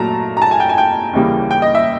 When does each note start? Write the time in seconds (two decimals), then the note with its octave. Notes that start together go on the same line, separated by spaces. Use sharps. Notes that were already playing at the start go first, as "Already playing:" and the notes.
Already playing: A#2 F#3 A3 A5 A#5
0.37 A#5
0.42 A5
0.51 G#5
0.60 G5
0.69 G#5
0.78 G5
1.13 D#2 C#3 E3 G3 A#3
1.51 G5
1.62 D#5
1.75 E5